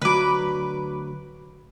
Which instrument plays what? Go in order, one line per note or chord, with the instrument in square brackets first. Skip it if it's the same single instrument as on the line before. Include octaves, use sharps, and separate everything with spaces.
[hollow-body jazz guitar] D2 F#3 [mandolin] B4 D6